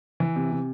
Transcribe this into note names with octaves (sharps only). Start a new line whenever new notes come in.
E3
C3
C3